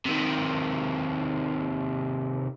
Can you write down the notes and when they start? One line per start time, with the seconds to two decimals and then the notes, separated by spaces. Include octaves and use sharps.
0.05 C3 D#3